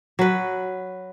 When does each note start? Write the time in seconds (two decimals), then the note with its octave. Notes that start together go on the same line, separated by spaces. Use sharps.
0.19 F#3 B4